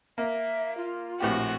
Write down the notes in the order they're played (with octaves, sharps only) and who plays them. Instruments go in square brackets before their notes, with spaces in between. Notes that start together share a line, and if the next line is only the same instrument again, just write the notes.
[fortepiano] A#3 [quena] E5
[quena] F4
[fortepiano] A#1 A2 G4 [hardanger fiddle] C4 F#4